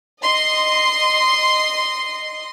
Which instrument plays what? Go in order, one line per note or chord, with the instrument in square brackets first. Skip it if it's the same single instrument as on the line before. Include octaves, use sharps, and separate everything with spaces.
[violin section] D#5 C6